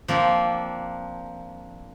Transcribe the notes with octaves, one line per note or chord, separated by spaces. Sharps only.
F3 A#3 C4 D4